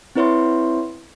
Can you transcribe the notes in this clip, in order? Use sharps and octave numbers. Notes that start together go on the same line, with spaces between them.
C4 E4 B4 C#5 E5 C6